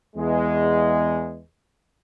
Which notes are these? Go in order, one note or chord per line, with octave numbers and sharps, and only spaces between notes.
E2 G#3